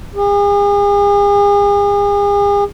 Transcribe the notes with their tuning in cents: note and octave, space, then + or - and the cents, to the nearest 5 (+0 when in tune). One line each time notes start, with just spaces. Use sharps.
G#4 -40